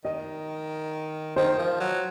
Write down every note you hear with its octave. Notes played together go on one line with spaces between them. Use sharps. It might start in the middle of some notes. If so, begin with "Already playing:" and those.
D#3 D#5
D#3 C5
F3
F#3